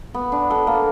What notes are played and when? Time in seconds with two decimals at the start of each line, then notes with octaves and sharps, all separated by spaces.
0.14 B3
0.32 D4
0.50 A4
0.67 A#3